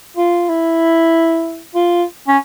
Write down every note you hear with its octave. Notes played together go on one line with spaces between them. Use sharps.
F4
E4
F4
C#4